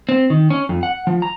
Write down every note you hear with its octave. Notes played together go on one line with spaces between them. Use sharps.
C4
D#3
C#4
F2
F#5
F3
A#5